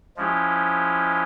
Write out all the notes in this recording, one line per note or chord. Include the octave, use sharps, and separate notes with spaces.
F3 G#3 C#4 E4 G4